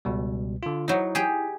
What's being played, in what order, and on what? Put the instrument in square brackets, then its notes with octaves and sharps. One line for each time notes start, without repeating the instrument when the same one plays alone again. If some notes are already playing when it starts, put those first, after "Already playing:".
[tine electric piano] C#2 B2 G3
D3 F4
[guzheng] F#3 D#4 [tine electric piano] E4
[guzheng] G4 G#4